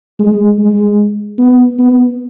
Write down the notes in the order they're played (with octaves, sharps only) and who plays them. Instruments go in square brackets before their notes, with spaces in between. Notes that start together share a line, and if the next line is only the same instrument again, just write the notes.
[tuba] G#3
G#3
B3
B3